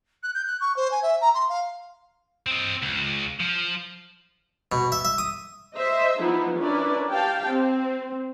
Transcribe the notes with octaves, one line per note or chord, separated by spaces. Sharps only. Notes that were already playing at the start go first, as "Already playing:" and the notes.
F#6
G6
F#6
C#6
C5
G#5
E5
A#5
C6
F5
C4 D#5
C#2
F3
B2
E5
E5
D#6
C5 D#5 E5
E3 F3 B3 D#4 E4
C#4 D4 E4 A#4 B4 D5
G4 F5 G5 A5
C4